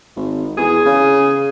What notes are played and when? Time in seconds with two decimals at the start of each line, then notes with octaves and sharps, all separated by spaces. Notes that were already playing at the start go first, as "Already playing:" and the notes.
0.16 G#1
0.57 E2 G#4
0.86 C#3